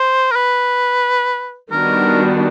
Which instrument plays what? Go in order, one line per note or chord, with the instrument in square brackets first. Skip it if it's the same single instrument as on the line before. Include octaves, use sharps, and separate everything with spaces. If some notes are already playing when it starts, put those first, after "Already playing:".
Already playing: [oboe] C5
A#4
B4
[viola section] D#3 G3 B3 D4 F#4 [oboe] A#4